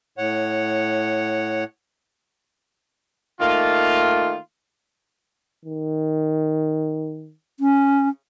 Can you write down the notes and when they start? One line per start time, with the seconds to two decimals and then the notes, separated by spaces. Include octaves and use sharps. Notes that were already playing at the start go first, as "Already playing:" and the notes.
0.18 A2 C#5 F#5
3.41 D#3 A3 A#3 F4
5.66 D#3
7.60 C#4